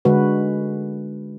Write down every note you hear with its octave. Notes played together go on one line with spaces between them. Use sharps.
D3 G#3 F#4 B4